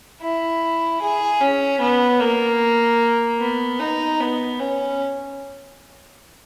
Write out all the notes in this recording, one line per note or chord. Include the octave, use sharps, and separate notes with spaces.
E4
G#4
C#4
B3
A#3
B3
D#4
B3
C#4